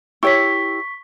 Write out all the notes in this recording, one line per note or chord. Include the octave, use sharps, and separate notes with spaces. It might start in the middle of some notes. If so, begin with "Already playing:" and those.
E4 G4 C#5 C#6 B6